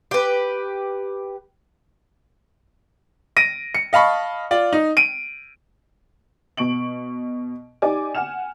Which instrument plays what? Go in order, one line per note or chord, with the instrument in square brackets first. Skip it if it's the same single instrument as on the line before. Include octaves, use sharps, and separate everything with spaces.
[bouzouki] G4 B4
[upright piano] A#6 D7 D#7
C#7
D#5 F5 A5 B5 C#6
F4 D5
D#4
D7 D#7
[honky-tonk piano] B2 C#6 D7 F#7
D#4 G4 D5 G#5 D6
F#5 G#5 F6 E7